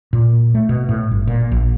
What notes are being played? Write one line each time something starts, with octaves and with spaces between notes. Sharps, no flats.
A#2
A3
B2
A2
G1
A#2
A#1